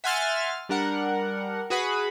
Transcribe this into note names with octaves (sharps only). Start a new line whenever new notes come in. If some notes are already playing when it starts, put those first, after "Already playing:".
E5 F#5 G#5 C6 F6 A6
G3 D4 A#4 F#5
F#4 G#4 B4 F#5 B5